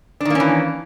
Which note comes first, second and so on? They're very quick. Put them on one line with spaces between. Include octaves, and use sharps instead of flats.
D4 D#3 A#3 C#4 E3